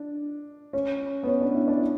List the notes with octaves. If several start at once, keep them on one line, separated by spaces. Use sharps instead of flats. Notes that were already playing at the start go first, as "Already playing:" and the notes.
Already playing: D4
C#4
B3
C#4
D4
E4
D4